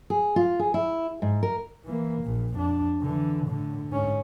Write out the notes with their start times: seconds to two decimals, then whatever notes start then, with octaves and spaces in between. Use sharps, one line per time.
0.10 G#4
0.36 F4
0.59 G#4
0.74 E4
1.22 G#2
1.43 A#4
1.85 E3 A#3
2.22 A#1 A#2
2.55 F2 D4
3.02 D3 E3
3.47 A2 D3
3.90 G#2 C#4